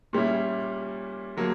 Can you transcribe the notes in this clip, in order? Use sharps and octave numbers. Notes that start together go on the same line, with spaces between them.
A#2 G3 C#4 E4
D3 F#3 A#3